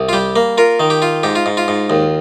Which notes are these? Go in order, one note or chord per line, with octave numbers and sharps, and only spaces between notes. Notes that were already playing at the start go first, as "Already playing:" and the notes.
Already playing: C2
F4
G3 G4
A#3
F4 A#4
D#3
G4
F4
G#2 G4
F4
G#2
F4
G#2
D#2